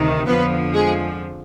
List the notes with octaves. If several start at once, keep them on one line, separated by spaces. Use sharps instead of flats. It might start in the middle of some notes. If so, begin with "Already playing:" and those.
Already playing: D2 C3 D#3
F2 D3 F3 B3 B4
G#3 G#4